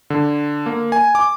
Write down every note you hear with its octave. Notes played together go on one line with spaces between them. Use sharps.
D3
A#3
G#5
D6